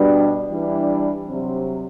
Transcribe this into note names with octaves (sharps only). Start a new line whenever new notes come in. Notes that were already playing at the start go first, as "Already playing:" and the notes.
Already playing: B2 G3 D4
E3 G3 D4
C3 F#3 C4